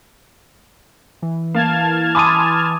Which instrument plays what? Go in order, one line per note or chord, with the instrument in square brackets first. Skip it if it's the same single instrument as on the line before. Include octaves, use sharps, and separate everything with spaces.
[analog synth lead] E3
[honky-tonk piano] A#3 [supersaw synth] A5 F6 G#6
[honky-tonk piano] G#5 B5 C6 [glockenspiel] D6 D#6 D#7